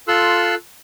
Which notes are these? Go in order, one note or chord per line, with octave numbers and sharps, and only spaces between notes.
F4 A4 C6 E6 F#6